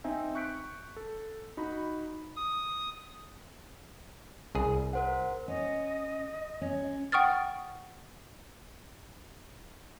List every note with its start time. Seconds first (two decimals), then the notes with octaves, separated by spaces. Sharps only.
0.04 C4 D#4 E5 G#5
0.35 C#6 F#6 G6 B6 C#7 D7
0.97 A4
1.57 D#4 F#4 B5
2.36 D#6
4.55 C2 G#4
4.93 A#4 C5 F#5
5.48 C#4 D#5
6.61 C#4
7.12 F#5 G5 C#6 D#6 F6 A6